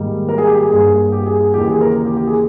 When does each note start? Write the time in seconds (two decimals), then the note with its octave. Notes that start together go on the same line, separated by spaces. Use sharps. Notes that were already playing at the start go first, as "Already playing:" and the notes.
Already playing: G#2 D#3 G3 A#3
0.29 A#4
0.38 G#4
0.47 G4
0.56 G#4
0.70 G2 G3 A#3 G#4
1.12 G4
1.26 G#4
1.40 G#4
1.54 D#2 C#3 E3 G4
1.68 G#4
1.81 A#4
2.06 G4
2.16 G4
2.27 G#4